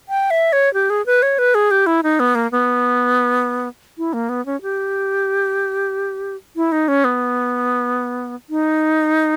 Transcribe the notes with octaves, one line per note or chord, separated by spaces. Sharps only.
G5
E5
C#5
G4
G#4
B4
C#5
B4
G#4
G4
E4
D#4
B3
A#3
B3
E4
A#3
B3
C#4
G4
E4
D#4
C#4
B3
D#4